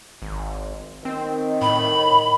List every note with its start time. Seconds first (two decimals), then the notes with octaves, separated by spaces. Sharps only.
0.22 G#1
1.05 D#3 C4
1.62 A2 B5